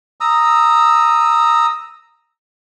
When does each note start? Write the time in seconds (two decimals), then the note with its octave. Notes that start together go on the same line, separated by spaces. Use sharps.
0.21 A#5 D#6 E6